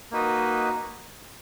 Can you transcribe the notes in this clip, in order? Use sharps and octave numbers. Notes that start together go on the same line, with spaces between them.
A#3 D#4 F#4 B4 D#5